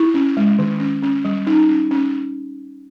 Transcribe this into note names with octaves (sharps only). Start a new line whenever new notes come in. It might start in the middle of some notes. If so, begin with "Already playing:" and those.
Already playing: E4
C#4
G#3
D#3
C#4
C#4
G3
C#4 D#4
C#4
C#4